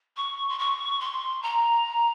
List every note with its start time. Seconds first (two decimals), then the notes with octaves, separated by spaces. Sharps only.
0.16 C#6
0.49 C6
0.59 C#6
1.00 C6
1.42 A#5